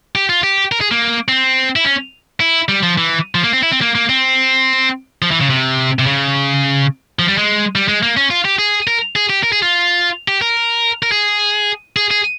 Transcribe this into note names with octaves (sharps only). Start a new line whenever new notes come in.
G4
F4
G4
A#4
G#4
A#3
C4
E4
C#4
E4
G3
F3
E3
F3
A#3
C4
E4
C4
A#3
A#3
C4
F3
E3
C#3
C3
C3
C#3
F3
G3
G#3
G3
G#3
A#3
C#4
F4
G4
G#4
A#4
G#4
G4
A#4
G#4
F4
G4
A#4
A#4
G#4
G#4
G#4